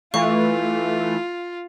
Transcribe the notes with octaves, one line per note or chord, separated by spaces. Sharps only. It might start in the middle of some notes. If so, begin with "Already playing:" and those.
E3 A3 F4 F5 C#6